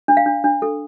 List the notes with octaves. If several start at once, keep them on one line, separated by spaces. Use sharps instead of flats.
D4
F5
D4
D4
A4